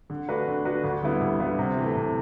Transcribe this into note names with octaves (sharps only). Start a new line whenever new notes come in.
D3
A3 D4 F#4 B4
D3
A3 D4 F#4 B4
D2
D3 G3 B3 E4
D2
D3 G3 B3 E4
C3
E3 A3
C3